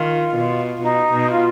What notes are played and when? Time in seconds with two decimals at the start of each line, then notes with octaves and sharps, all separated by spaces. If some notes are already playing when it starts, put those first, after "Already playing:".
Already playing: D#3 F4
0.35 B2
0.82 B2 D#4
1.13 B2
1.29 F4